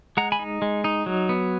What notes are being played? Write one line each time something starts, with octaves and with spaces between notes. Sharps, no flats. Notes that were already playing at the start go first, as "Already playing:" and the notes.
G#3 F#5 A#5
G#5 B5
D#4
G#3
D#4
F#3
B3